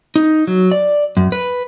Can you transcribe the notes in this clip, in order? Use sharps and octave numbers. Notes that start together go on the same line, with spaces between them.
D#4
F#3
D5
F#2
B4